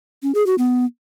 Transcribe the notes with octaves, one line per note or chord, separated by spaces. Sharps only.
C#4
G#4
F#4
B3